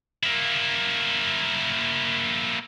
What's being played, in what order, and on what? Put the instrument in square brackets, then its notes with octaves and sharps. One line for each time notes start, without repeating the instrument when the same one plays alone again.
[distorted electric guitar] A#3 E4